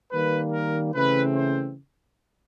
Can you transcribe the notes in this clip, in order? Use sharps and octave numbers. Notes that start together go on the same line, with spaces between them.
D#3 G3 A#3 B4
A#4
C#3 E3 A3 C4 B4
C5